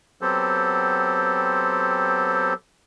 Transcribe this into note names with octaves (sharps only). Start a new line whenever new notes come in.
F#3 B3 C4 G4 A4 C5